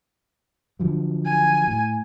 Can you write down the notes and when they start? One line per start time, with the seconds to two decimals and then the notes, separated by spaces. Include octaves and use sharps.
0.79 D3 F3 F#3
1.25 G#5
1.68 A2